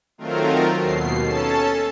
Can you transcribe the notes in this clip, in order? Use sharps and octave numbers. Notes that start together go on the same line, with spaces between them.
D#3 F#3 A3 C4 F4 A#4
D#2 B2 C7
C#4 A4 A5